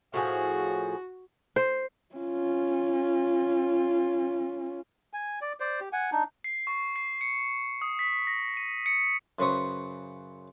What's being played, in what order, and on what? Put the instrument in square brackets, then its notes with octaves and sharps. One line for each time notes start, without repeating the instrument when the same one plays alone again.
[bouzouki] A2 F3 G#4 [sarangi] F#4
[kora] C5
[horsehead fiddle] C#4 F4
[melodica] G#5
D5
C5 D5
G4
F#5 G#5
D4 D#4
[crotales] C7
C#6
C7
C#7
D#6
B6
A#6
D#7
C#7
[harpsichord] F#2 C#3 B4 C5 C#6 D#6